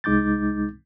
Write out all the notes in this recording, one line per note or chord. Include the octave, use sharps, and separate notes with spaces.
C2 G#3 D#4 D6 G6 A6